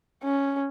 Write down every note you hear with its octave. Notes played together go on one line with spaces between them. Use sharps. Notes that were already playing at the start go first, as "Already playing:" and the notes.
C#4